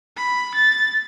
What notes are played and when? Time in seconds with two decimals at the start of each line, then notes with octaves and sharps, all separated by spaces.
0.17 B5
0.55 A6